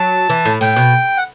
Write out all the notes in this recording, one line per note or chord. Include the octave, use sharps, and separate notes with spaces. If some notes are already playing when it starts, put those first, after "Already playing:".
Already playing: F#3 A5
E3
A2
A2 G5
B2
F#5